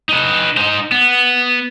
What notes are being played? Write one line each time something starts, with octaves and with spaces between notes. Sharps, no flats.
D#4 B4
D#4 C5
B3